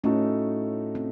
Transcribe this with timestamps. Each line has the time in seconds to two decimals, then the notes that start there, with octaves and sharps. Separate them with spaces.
0.04 A2 A3 C#4 D#4 F#4 A4
0.95 C4